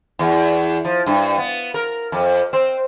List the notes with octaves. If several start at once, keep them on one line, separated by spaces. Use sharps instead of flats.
E2
F3
G2
B3
A#4
F2
C4